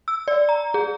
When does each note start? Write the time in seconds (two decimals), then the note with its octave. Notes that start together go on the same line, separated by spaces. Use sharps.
0.08 E6
0.28 D5
0.49 A#5
0.74 G#4